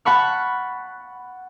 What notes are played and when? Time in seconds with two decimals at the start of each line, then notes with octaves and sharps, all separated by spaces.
0.05 F#5 A5 B5 C#6 F6